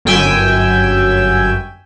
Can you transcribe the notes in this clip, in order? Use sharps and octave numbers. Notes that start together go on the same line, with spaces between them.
G1 F#2 G5 G#5 E6 B6